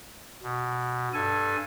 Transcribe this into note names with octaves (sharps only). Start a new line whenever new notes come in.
B2
G2 A4 G#5